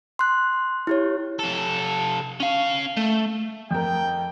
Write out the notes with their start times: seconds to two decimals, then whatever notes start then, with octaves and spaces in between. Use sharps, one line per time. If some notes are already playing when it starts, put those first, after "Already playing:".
0.19 C6 F#6
0.87 E4 G4 C#5
1.40 C3 A4
2.40 C#4 F5
2.97 A3
3.71 F2 A#4 G5